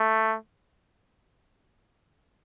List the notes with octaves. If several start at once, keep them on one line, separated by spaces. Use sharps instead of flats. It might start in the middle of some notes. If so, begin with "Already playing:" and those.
Already playing: A3